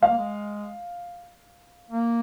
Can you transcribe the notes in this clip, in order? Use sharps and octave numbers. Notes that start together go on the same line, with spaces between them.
G#3 F5
A#3
G#3
A#3